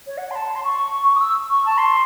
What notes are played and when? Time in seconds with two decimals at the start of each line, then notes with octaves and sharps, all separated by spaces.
0.07 C#5
0.18 F#5
0.31 C6
0.35 A5
0.55 C6
0.64 C#6
1.16 D#6
1.20 E6
1.49 C#6
1.66 A5
1.78 C6